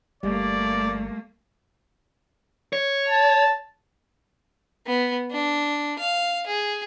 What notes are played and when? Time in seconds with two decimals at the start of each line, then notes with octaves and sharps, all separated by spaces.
0.23 G1 G3 A3 A#3 D5
2.73 C#5
3.08 A5
4.87 B3
5.31 D4
5.99 F5
6.47 G#4